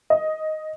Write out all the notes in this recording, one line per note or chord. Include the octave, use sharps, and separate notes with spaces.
D#5